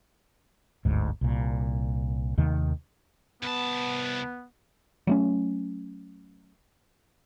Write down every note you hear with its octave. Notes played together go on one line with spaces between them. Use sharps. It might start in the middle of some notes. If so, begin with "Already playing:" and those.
G1 D2 G#2
C2 A#2
D#2 C3 D#3 A3
C2 B3 A5
F#3 A3 C#4